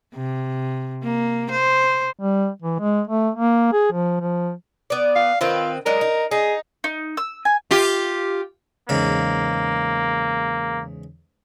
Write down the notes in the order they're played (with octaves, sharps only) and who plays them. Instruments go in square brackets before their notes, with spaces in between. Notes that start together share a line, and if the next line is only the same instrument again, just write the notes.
[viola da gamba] C3
A#3
C5
[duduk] G3
E3
G#3
A3
A#3
G#4
F3
F3
[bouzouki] B3 D5
[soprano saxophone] F5
[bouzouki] D#3 C4 B4 [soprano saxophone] F4
[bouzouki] F#3 G#3 D4 [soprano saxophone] A#4
[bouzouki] D#4
[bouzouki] D#4 [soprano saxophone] G#4
[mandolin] D#4
E6
G#5
[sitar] F4 G4
[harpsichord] E2 G#2 C#3 [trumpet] A#3